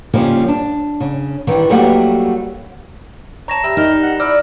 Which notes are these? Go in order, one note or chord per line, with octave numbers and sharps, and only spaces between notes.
C#3 F3 G3 A#3 C#4 D#4
D4
C#3
D#3 E3 G3
F#3 G3 A3 A#3 F#4 G4
C#5 A5 A#5 A#6 E7
G3 E5
D#4 A#4
F#5
E4 D5 E6 F6